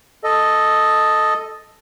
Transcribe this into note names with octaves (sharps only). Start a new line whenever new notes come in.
A4 D#5